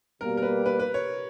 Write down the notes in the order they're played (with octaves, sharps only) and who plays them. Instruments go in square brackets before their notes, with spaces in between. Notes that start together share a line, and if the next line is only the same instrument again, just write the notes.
[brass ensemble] B2 G3 A#3 [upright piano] A#4
[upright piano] A#4
B4
B4
B4
C#5